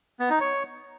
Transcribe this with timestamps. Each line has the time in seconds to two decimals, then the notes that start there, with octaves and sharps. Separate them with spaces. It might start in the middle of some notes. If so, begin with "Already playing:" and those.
0.20 B3
0.30 D#4
0.40 C#5